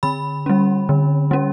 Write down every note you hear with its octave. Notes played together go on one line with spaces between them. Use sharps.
D3 B5
G3 C#4
D3
G3 C#4